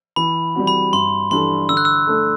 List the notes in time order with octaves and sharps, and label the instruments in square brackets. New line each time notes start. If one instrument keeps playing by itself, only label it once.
[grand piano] E3 [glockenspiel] B5
[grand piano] G3 C4 F#4
[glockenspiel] B5
[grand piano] G2 [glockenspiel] C6
[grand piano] E3 G3 D4 A4 [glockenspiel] C6
[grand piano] D3 [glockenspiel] E6
[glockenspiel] F#6
E6
[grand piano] A3 D4 A4